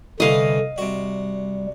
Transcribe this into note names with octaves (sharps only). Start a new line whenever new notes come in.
C2 D3 E3 A3 D#5 F5
C3 G3 F#4